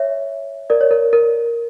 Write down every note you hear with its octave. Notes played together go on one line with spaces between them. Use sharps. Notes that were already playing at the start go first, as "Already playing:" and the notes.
Already playing: C#5 E5
A#4 D5
C#5
A#4
A#4